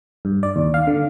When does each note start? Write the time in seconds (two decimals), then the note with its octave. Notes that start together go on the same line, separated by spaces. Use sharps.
0.25 G2
0.43 D5
0.56 D#2
0.74 F5
0.87 D3